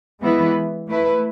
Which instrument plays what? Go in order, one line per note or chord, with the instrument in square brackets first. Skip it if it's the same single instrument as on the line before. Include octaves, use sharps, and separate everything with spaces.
[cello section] E3 G#3 B3 E4 B4
A3 E4 B4